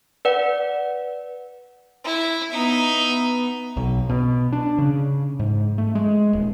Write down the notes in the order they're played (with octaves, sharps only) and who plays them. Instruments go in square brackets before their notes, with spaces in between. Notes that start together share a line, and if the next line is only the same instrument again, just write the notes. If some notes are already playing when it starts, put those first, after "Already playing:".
[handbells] B4 D5 F#5
[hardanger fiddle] E4
[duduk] B3 [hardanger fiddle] D#4 E5
[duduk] B3
[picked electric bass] B1
B2
D4
C#3
G#2
A3
G#3
D#1